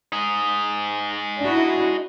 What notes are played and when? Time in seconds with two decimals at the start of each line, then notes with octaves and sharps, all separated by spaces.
0.12 D#4 G#4
1.39 D4 E4 F#4